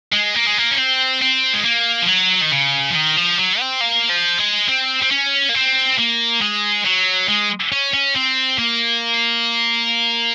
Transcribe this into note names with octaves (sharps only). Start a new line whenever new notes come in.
G#3
A#3
G#3
A#3
C#4
C4
C4
G#3
A#3
F3
F#3
D#3
C#3
F3
D#3
F3
F#3
C4
A#3
F3
G#3
C4
C4
C#4
A#3
C4
A#3
G#3
F#3
G#3
C#4
C#4
C4
A#3